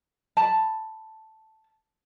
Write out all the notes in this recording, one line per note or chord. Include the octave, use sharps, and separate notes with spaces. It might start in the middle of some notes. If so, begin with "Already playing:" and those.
A5 B5